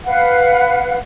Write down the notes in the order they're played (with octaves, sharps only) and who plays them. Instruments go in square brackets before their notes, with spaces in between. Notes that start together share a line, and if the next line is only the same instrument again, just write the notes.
[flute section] B4 F5 F#5